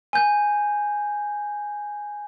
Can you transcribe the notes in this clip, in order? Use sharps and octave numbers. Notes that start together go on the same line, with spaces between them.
G#5 G6